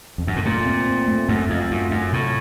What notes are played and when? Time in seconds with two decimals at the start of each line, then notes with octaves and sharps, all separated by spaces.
0.18 F2
0.27 F#2
0.36 A2
0.45 A#2 A3
0.66 C4
0.87 C4
1.08 A3
1.28 F#2 A3
1.49 F2 F4
1.71 F#2 F4
1.91 F#2 A3
2.12 A2 C3